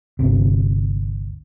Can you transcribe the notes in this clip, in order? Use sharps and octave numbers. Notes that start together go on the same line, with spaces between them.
G1 D2 C3